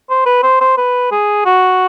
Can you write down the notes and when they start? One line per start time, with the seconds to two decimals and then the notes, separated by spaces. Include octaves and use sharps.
0.10 C5
0.26 B4
0.43 C5
0.61 C5
0.78 B4
1.12 G#4
1.46 F#4